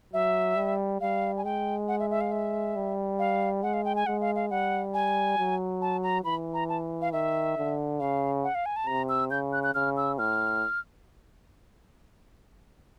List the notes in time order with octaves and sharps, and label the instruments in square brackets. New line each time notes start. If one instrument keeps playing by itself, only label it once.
[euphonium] F#3 [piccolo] E5
[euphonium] G3
[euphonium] G3 [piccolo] F5
[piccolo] G#5
[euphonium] G#3 [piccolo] G5
[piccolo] F#5
E5
E5
F5
E5
[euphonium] G3
[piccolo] F5
[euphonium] G#3 [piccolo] F#5
[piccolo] F5
G5
G#5
[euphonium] G#3 [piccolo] F#5
[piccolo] F5
F5
[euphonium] G3 [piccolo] F#5
[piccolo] G#5
[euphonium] F#3
[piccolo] A5
A#5
[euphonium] E3 [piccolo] B5
[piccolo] A#5
A5
F5
[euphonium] D#3 [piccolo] E5
[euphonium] D3
[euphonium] C#3 [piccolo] F5
[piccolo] F#5
F5
G#5
A5
[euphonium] C3 [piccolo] A#5
[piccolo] E6
[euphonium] C#3 [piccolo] G6
[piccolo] F#6
F#6
[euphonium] C#3 [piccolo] F6
[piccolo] E6
[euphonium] A2 [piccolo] F6